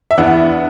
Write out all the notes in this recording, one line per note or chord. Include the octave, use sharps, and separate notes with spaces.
E5
E2 E3 B3 D4 F#5